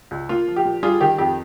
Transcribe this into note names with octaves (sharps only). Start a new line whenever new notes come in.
C#2
A#3 F4
F3
G4
A#2
G3 F4 G#4
D#3 G4
F2 G4